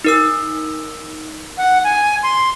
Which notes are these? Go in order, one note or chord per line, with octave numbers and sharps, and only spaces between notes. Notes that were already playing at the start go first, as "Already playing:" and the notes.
D#4 A#4 E6
F#5
G#5
C6